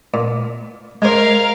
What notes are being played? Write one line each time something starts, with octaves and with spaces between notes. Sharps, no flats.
A#2
G#3 A#4 C5 F5